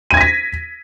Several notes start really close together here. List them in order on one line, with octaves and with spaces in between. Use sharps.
D#7 G#6 A#6 B6